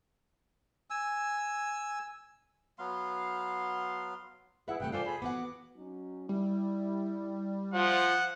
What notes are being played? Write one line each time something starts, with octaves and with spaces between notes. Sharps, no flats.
G#5 E6
F#3 B3 F5 C6
E4 G#4 B4 E5 F#5
C3 G3 A3 G5 F#6
F4 A4 C5 D5 F5 G#5
G#4 B5
B3 F#4 F#5 D6
F#3 C#4 D#4
G3 E4
F3 F#5